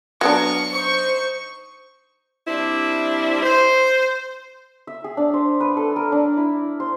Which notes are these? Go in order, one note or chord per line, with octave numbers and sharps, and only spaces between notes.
F#3 B3 D4 F4 A#5 C#6 C#7
D#4 C5 C#6
G3 C4 D4 E4
C5
E5
G#4
D4
C5
B4
A4
A#4
D4
E4
C5